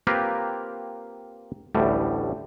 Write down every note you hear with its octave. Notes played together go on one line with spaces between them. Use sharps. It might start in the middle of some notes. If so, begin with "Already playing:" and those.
A#3 C4 F4 G4 A#4 B4
A1 D2 A2 G3